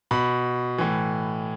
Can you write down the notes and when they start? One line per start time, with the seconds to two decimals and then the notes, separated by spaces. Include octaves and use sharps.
0.11 B2 B5
0.78 A2 E3